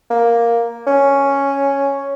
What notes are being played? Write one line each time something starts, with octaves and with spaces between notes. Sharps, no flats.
A#3
C#4